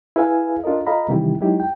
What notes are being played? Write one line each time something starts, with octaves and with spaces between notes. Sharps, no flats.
E4 G#4 B4 E5 F5 G#5
D4 F4 A4 A#4 D#5
F4 A4 D#5 F5 A#5 B5
C3 D#3 E3 G3 E4 G4
F#3 G#3 D#4 E4 G4
G5